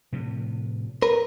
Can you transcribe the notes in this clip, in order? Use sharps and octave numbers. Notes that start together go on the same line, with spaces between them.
A2 C3 F3
A#4 B4